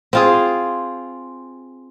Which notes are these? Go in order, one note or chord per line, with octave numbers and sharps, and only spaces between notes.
C4 F4 G#4